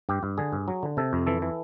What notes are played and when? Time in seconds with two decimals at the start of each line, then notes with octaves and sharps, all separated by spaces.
0.09 G2 G4
0.23 G2
0.38 D3 G#4
0.53 G2
0.68 F#3
0.83 D3
0.97 C3 A4
1.13 F2
1.27 E3 A4
1.42 E3